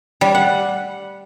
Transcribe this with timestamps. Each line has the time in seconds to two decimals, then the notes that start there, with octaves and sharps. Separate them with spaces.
0.21 G3
0.35 F#5